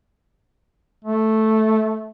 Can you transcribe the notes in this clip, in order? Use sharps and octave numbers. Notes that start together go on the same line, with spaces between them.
A3